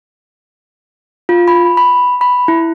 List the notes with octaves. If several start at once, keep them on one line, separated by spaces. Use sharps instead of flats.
F4
B5
B5
B5
E4